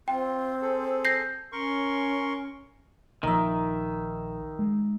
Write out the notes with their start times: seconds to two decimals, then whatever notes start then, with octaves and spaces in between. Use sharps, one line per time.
0.08 C4 F4 G5
0.62 G#4 A4
1.05 G6 A#6 C7
1.52 C#4 A#4 C6 C#6
3.23 A#1 D#3 F3 D#4 E5
4.59 G#3